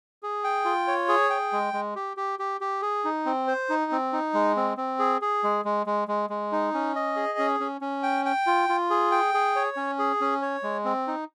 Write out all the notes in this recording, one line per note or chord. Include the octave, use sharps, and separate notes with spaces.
G#4
G5
F4
C#5
G#4
G5
G#3
G#3
G4
G4
G4
G4
G#4
D#4
C4
C5
D#4
C4
D#4
G#3
C4
C4
G#4
G#4
G#3
G#3
G#3
G#3
G#3
D#4
C#4
D#5
G#4
C#4
C#4
C#4
G5
G5
F4
F4
G#4
G5
G#4
C#5
C#4
G#4
C#4
C#5
G#3
C4
D#4